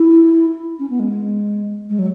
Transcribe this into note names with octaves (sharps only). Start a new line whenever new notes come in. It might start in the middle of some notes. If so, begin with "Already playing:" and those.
Already playing: E4
C#4
B3
G#3
G#3
F#3